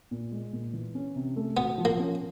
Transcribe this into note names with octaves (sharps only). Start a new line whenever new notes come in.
A#2
G#3
A#2
E3
C#4
C3
A3
B3 F#4
F3
A#3
C#4